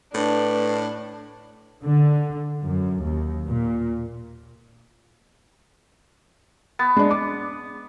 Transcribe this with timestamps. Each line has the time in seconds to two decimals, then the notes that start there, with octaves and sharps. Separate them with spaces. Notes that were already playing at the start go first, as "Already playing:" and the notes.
0.14 A2 D4 B4
1.84 D3
2.64 F#2
3.04 D#2
3.48 A#2
6.79 B3
6.97 G#3 D4
7.11 D6